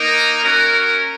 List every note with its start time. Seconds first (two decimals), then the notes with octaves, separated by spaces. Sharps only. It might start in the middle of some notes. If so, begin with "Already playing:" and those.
Already playing: A#3 D#4 A#4
0.43 C#4 F#4 A#4